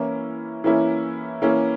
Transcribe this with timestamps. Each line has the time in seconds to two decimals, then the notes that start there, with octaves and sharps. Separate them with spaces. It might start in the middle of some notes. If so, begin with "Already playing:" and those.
Already playing: E3 A#3 C#4 E4
0.64 E3 A#3 C#4 E4
1.42 E3 A#3 C#4 E4